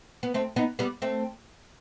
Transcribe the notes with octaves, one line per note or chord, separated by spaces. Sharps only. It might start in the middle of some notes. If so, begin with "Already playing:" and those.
B3
A3 C4
B3 D#4
G3 B3
A3 C4